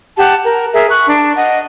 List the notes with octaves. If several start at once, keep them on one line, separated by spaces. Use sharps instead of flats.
G4 F#5 A5
A#4
G#4 A#4 E5
C#6 F#6
D4
D#5 F#5